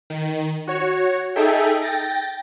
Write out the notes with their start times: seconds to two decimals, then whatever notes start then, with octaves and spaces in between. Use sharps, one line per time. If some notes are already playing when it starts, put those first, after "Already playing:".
0.10 D#3
0.67 F#4 C#5
1.36 D#4 G#4 A4 E5 G5
1.82 G5 A6 A#6